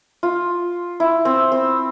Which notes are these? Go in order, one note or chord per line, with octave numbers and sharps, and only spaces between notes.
F4
E4
C4
C4